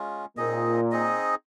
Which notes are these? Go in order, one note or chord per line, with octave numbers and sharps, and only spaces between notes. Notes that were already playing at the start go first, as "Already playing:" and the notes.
Already playing: G#3 C#4 F4
A#2 C4 D#4 G#4 D#5
C4 D#4 G#4 D#5